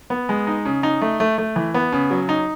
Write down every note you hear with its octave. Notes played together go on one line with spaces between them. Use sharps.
B3
G#3
D#4
C#3
D#4
A3
A3
A3
E3
B3
C#3
F#3
D#4